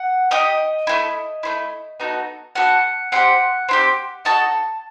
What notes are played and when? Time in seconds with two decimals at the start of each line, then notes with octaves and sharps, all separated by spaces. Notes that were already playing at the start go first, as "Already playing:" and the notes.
Already playing: F#5
0.31 D#4 G4 D#5
0.87 A3 C4 E4
1.43 A3 C4 E4
2.00 B3 D#4 F#4 A4
2.55 B3 D#4 F#4 A4 F#5
3.12 C4 E4 G4 F#5
3.69 C4 E4 G4
4.25 D#4 F#4 A4 A5